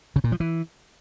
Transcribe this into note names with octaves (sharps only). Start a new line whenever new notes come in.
C#3
A#2
F3
E3